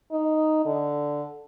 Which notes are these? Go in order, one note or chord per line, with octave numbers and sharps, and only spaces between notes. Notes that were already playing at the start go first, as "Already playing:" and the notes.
D#4
D3